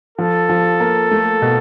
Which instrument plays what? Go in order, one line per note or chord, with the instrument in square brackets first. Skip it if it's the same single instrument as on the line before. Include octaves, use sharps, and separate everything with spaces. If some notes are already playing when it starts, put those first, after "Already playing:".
[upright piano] F3 [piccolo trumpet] A4
[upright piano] F3
A#3
A3
B2